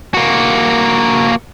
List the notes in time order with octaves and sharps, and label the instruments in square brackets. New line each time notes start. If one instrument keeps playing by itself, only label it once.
[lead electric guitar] A#3 F#4